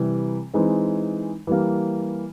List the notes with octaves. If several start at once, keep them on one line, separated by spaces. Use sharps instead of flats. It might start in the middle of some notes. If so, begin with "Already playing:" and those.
Already playing: C3 E3 G3
E3 G#3 C4 D#4
E3 G3 A#3